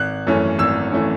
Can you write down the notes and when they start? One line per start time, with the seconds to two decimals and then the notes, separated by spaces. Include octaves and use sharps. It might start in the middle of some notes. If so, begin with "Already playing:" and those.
Already playing: G#1 F#6
0.27 F#2 E3 A3 C#4
0.59 G#1 E6
0.92 E3 A3 C#4